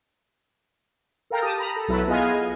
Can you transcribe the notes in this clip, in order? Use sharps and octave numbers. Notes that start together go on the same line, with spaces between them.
A4 A#4 F5 G5 A#5
G4 A5 D#6
A#5 B5
A4
B1 F#3 E4 A4 B4
B3 F4 G#4 D#5 F5 G#5